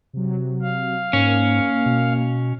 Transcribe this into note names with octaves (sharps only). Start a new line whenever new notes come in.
C3 F#3
F5
G#2 A#3 C#4
B2